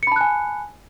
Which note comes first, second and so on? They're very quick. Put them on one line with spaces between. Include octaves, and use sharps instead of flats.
C#7 B5 A5 F#6 G#5